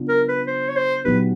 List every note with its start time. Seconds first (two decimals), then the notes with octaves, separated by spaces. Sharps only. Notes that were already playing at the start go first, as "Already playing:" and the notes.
Already playing: C#3 F#3 B3 D4 F4
0.09 A#4
0.28 B4
0.47 C5
0.69 C#5
0.76 C5
1.05 A#2 F#3 B3 D#4 G4 B4